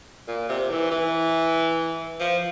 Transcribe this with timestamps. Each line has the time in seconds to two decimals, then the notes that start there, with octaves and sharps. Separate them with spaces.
0.28 A#2
0.49 C3
0.70 E3
0.91 E3
2.20 F3